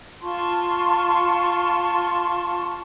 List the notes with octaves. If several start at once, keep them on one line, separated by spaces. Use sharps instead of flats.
F4 A5 C6 C#6